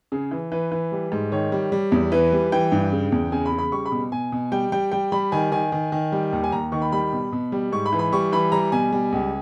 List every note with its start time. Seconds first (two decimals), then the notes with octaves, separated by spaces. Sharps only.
0.12 C#3 G#4
0.31 E3
0.52 E3 B4
0.72 E3
0.92 G3
1.12 G#2
1.32 D#3 C#5
1.52 G3
1.72 G3
1.92 E2
2.12 E3 B4
2.32 G3
2.52 E3 G5
2.72 G2
2.92 C#3
3.12 E2
3.32 C#3 G#5
3.46 B5
3.52 C#3
3.58 B5
3.72 G3 C#6
3.86 B5
3.92 B2
4.12 B2 G#5
4.32 B2
4.52 G3 G5
4.72 G3 G5
4.92 G3 G5
5.12 G3 B5
5.32 D#3 G#5
5.52 D#3 G#5
5.72 D#3
5.92 D#3
6.12 G3
6.33 D#2
6.44 G#5
6.52 D#2 A#5
6.72 D#3 C#6
6.82 B5
6.92 G3 B5
7.13 B2
7.32 B2
7.52 G3
7.72 G#2 C#6
7.86 B5
7.93 E3
7.99 B5
8.12 G3 C#6
8.32 E3 B5
8.52 G3 A#5
8.72 B2 G#5
8.92 G3
9.12 C#2